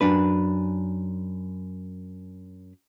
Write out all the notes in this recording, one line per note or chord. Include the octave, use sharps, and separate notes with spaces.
F#2 D4 B4